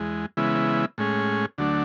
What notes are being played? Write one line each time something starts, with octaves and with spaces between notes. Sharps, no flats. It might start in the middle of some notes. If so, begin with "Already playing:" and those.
Already playing: E2 G#3
C#3 E3 G#3 B3 E4
A2 G#3 C#4 G#4
D2 D3 F#3 A3 D4